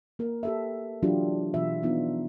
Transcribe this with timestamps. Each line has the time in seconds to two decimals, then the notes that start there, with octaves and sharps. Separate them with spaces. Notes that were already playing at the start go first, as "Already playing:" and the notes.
0.19 A#3 A#4
0.43 G4 A4 E5
1.02 C3 E3 F#3 D4 F4 G4
1.54 B2 E3 F4 E5
1.83 F3 B3 D4 D#4 F4